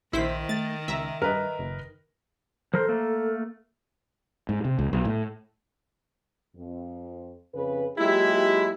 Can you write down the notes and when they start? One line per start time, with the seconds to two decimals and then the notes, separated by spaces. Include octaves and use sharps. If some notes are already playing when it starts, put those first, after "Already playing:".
0.13 A#1 D#3 E4 C5 B6
0.49 A3 A6
0.88 C#2 E5 A#5
1.22 G2 A#4 B4 D#5
1.59 F#1
2.74 F3 A4 A#4 C5
2.89 A3 A#3
4.49 G#2
4.65 C3
4.79 C#2
4.93 B1
5.05 A2
6.56 F2
7.55 F2 C#3 B4
7.98 F#3 G#3 A#3 E4 F4 G4